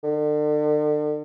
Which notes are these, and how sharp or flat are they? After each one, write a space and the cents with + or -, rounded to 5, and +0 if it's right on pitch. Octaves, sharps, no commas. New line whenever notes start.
D3 +40